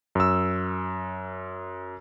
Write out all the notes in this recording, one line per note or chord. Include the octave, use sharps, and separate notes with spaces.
F#2 E6